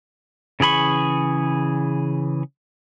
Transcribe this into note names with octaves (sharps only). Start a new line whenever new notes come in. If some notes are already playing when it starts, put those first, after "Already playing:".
C#3 E3 G#4 B5 C#6